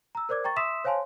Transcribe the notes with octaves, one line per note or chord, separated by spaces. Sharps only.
A#5 E6
A#4 C5 D5 D6 G#6
G5 A#5 C#6 A6
E5 C6 D#6 E6 B6 E7
C5 C#5 F5 G#5 A5 C6